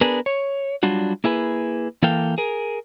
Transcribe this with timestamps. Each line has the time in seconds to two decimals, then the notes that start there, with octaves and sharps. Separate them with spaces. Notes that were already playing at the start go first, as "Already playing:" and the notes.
0.01 B3 D4 G#4 A#4 B4
0.26 C#5
0.83 F#3 G3 D4 F4 F#4
1.24 A#3 E4 G#4 B4
2.03 E3 A#3 A4 F5 G5
2.38 G#4 A#4